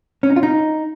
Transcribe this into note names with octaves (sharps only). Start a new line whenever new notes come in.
C#4
D#4
F4
D#4